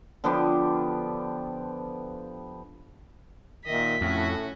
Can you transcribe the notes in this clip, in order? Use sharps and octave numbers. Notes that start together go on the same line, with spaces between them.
D3 F3 B3 G4
A#2 D#3 D#5 E5 B6
F2 A2 C#4 F#4